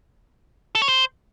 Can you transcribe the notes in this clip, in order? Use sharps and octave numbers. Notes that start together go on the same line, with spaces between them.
A4
C#5
C5